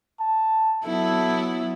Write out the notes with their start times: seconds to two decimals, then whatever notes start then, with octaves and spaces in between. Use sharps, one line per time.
0.20 A5
0.85 F#3 B3 E4 A4